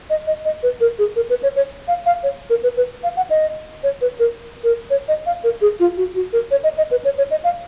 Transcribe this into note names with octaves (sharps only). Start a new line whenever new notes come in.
D#5
D#5
D#5
B4
A#4
G#4
A#4
B4
C#5
C#5
F5
F5
C#5
A#4
B4
B4
F5
F#5
D#5
C#5
B4
A#4
A#4
C#5
D#5
F5
A#4
G#4
F4
F#4
F#4
A#4
C#5
D#5
D#5
B4
C#5
C#5
D#5
F5